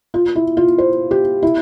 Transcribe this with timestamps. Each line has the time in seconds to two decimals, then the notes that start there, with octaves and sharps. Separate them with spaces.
0.14 F4
0.36 E4
0.57 F4
0.78 C5
1.11 G4
1.42 E4